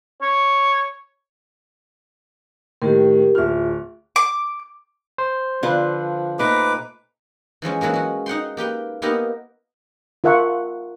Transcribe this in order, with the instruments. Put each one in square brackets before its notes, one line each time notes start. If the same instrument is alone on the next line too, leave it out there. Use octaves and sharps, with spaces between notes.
[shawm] C#5
[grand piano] A2 D#3 [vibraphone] G4 A#4
[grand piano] D1 F6 [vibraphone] F4 E5
[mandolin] D6
[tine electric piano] C5
[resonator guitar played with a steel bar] D3 F4 B4 [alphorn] F3
[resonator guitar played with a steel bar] A#2 A3 D#4 [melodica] B4 D6
[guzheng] E3 F3 G#3 C#4
E3 F#3 G#3 A#3
G#3 F#4
D#4 F#5 G5 C6
A#3 G4 B4 G5
A#3 B3 D#4 E4 G4 A#4
[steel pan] F4 A#4 E5 F#5 A5 C#6